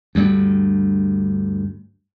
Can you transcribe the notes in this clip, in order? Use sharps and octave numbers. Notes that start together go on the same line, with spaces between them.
D2 G2 G3